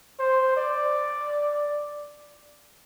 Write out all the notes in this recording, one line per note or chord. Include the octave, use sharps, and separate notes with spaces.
C5
D5